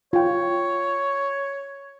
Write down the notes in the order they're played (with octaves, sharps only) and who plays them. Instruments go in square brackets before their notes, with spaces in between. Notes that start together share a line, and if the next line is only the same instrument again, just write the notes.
[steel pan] F4 G5 [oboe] C#5